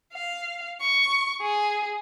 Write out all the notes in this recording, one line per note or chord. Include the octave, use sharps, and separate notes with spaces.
F5
C#6
G#4